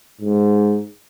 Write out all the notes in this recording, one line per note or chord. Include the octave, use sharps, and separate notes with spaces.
G#2